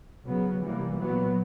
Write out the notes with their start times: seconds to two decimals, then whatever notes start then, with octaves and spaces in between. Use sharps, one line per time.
0.25 C#3 F#3 B3
0.61 C3 E3 G3 A#3
0.98 A#2 F#3 B3